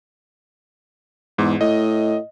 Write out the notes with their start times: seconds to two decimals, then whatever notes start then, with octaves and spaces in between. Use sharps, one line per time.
1.38 E2 G#2
1.61 A2 D#5